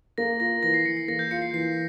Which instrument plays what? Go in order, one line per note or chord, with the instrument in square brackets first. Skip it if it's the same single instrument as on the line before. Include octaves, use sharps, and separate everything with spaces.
[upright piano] A#3 [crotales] A#6
[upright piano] F4 [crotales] A#6
[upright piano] E3 [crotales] A#6
[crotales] C7
[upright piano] E3 [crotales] C#7
[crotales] C7
[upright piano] A#3 [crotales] A#6
[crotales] G6
[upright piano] F4 [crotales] C#7
[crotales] C7
[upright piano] E3 [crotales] C7